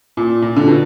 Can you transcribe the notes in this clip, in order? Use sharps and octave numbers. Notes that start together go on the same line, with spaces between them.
A#2
A#2
D3
B2